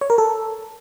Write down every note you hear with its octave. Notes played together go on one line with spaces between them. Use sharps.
C#5
A#4
A4